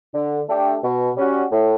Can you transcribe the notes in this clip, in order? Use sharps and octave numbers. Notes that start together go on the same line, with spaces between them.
D3
A3 D4 G4
B2
G3 C#4 F#4
A2